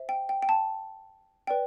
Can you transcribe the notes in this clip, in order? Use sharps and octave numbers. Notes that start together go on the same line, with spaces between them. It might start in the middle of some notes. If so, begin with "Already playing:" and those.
Already playing: C5 E5
G5
G5
G5
A5
B4 D5 G5